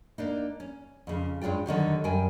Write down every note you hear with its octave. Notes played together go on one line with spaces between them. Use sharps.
A#3 D4 D#4
C#4
F2 C#3
G2 G#3 C#4 F4 G5
D3 D#3 F#3 G3
F#2 G3 A#4 G5 G#5